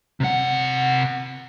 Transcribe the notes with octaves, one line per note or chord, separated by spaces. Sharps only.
C3 F#5